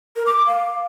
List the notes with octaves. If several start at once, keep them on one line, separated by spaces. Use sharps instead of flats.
A#4
D6
D6
F5